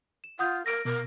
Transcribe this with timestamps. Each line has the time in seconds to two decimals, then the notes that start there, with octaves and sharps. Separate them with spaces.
0.24 E7
0.39 F4 F#5 D#6 G6
0.66 A#4 A#6 D7
0.85 B2 A#4